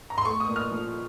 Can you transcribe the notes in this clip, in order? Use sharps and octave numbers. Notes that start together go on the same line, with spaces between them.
A#5
C6
A3 C#6
D#6
A#2
F6
F3